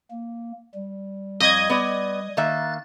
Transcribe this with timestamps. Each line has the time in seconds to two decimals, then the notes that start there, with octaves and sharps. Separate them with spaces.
0.11 A#3
0.74 G3
1.40 F2 D#5 D#6 G#6
1.70 B3 D5
2.37 D#3 A#3 E5 F#6 A6